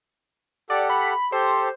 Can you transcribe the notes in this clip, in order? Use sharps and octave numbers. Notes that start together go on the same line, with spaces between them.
G4 A4 D5 F#5
B5
G4 A4 C5